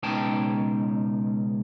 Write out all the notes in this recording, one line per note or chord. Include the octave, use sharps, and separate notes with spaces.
C#2 B2 D#4 C#5 G5 A5